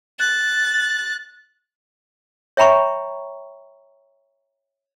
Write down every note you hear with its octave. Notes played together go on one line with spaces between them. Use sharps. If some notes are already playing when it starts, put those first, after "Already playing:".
F#6 A6
C#5 E5 G5 A#5 B5 C#6